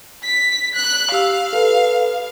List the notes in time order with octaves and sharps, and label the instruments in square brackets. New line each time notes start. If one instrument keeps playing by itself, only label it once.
[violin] B6
F#6
[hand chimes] G4 E6 [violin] F5
[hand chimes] A4 B4